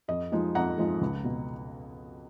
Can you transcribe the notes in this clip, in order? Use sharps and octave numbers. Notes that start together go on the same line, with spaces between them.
F2 D#5
F3 G#3 D#4
F2 F#5 A#5
F3 G#3 D#4
C#2
B2